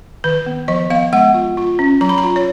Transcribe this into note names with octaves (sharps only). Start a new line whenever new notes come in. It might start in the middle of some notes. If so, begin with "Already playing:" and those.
D#3 B4
B3
F3 D#5
B3 F5
G#3 F#5
F4
F4
C#4
F#3 A#5
B5
A#5
F4
C#5